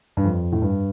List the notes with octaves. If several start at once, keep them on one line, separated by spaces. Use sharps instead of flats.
G2
F2
A2
G2